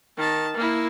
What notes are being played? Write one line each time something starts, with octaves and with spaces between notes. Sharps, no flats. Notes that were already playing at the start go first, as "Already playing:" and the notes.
D#3 A5
A#3 E4